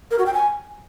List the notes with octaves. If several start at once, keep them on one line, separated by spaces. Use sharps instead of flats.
A#4
F#4
G5
G#5